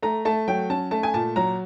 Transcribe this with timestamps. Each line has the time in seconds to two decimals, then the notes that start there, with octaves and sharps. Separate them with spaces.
0.03 A3 A#5
0.25 A3 A5
0.48 F#3 G5
0.70 C#4 A5
0.91 A3 A5
1.03 G#5
1.14 A#2 A5
1.36 F#3 A#5